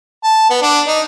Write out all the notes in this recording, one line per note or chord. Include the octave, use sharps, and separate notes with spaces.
A5
B3
D4
D#4